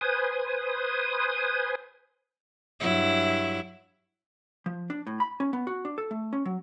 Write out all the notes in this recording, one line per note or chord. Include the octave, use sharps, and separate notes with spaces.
B4 C5 G#5 D#6
G2 F#3 E4
F3
D4
A2
B5
C#4
B3
F#4
D4
A4
A3
C#4
F#3